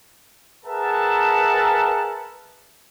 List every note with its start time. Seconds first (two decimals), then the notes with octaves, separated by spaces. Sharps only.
0.65 G#4 A#4 B4 E5 F#5 A5